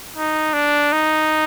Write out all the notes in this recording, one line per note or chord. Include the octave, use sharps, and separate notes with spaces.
D#4
D4
D#4